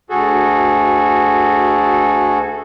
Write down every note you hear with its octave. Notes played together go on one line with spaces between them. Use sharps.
D2 F#4 G#4 A4